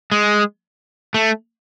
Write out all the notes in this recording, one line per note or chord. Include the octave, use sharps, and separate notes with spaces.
G#3
A3